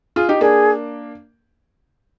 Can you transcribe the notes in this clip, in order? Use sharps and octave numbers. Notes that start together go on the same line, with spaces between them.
F4 G#4
D#4 G4
A#3 D4 G#4